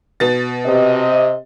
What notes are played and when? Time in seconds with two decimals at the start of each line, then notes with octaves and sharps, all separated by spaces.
0.20 B2 A6
0.66 C3 D#5